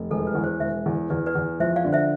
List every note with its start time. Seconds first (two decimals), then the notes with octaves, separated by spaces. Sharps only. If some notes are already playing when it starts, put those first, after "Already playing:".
Already playing: F1
0.10 E1 A4
0.27 B4
0.35 E2
0.44 C5
0.60 E1 C5 E5
0.86 E2
1.10 E2 B4 D5
1.26 B4 D5
1.35 E2
1.60 F3 C5 E5
1.76 D5 F5
1.85 D3
1.92 C5 E5